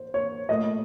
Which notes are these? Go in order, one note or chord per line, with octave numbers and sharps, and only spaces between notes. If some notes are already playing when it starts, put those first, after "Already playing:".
Already playing: C5
C#5
A#2 A3 D#5